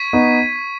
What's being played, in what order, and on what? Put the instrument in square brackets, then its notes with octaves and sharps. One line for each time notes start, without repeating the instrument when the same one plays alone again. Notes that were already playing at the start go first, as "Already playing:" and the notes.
Already playing: [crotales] C#6 G#6 B6 D#7
[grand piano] B3 D#4